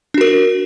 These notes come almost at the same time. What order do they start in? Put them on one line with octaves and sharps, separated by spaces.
D4 F#4 A#4